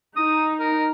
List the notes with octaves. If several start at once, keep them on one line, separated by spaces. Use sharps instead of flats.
D#4 D#6
A#4